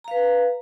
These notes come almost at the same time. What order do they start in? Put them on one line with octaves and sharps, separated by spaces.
A#5 F5 B4